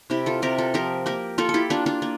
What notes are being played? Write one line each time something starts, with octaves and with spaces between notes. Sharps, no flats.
C3 E4 G4
F4 A4
C3 G4 A#4
F4 A4
F3 G4 A#4
A#3 G4 A#4
A#3 F4 A4
A4
E4 G4
A#3 D4 F4
D4 F4
A#3